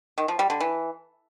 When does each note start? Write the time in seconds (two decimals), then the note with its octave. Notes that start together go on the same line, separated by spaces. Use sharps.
0.18 D#3
0.28 F3
0.39 G3
0.50 D3
0.60 E3